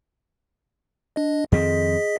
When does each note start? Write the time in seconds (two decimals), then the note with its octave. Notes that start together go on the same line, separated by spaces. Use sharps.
1.16 D4 D#5
1.52 F2 D#3 C4 G#4 D#5 B6